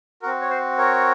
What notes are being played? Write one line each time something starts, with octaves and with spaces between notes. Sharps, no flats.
C4 F#4 A#4
C#5
C5
A#4 C#5